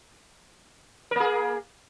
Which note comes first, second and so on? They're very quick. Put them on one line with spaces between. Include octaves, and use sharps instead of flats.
A#4 A#3 G#4